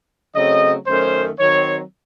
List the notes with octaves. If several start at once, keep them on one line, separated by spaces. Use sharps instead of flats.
C#3 F#3 A3 C4 D#5
F#2 D#3 A3 C#4 C5
D#3 F#3 C4 C#5